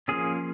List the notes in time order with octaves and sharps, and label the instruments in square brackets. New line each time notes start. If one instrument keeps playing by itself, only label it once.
[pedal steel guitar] F3 A#3 C#4 G#4